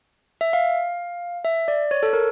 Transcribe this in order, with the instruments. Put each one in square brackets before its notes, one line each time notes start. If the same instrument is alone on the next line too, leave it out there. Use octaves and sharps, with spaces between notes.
[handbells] E5
F5
E5
D5
C#5
A4
A#4